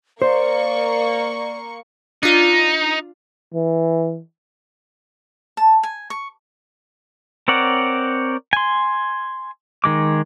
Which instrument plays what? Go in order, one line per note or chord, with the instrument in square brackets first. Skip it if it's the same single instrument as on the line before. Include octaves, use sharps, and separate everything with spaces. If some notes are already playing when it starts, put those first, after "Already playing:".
[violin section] A#3 C#6 [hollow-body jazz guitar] C5 [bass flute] D5
[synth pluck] D4 F4 [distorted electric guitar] D#4
[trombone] E3
[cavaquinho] A5
G#5
C#6
[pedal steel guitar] C4 A#4 C#5 D5 F#5
G#5 C6
D#3 G#3 D6